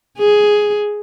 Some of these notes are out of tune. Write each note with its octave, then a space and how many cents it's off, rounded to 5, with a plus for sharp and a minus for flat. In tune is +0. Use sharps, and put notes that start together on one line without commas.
G#4 +5